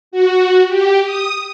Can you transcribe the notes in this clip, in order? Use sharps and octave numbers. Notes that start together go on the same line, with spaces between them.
F#4
G4
D#6